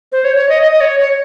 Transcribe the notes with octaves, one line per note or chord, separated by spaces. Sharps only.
C5
C#5
C#5
D#5
D#5
D#5
C#5
C#5